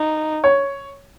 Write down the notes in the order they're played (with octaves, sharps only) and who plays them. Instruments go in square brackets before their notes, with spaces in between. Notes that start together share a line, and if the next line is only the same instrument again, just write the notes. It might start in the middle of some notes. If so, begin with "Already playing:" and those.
Already playing: [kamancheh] D#4
[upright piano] C#5